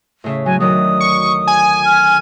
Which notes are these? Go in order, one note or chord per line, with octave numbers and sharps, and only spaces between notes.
A2 C#3 E5
F#3 G#5
D2 D#3 F#3 D#6
C#6
G#5
F6